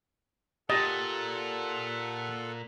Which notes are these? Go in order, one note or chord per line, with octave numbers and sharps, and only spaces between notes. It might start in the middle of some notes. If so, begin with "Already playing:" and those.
A#2 G4 A4 D#5 F#5 A6